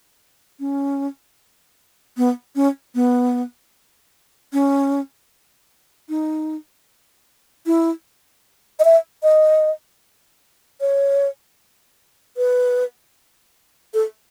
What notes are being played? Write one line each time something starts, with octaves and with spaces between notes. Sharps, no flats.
C#4
B3
C#4
B3
C#4
D#4
E4
D#5
E5
D#5
C#5
B4
A4